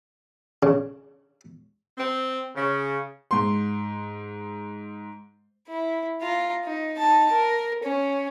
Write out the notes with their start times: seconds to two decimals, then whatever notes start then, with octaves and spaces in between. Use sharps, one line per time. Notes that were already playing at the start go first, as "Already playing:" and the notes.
0.63 C#3
1.98 C4
2.55 C#3
3.31 G#2 C6
5.68 E4
6.22 F4 A#5
6.65 D#4
6.98 D#4 A5
7.32 A#4
7.83 C#4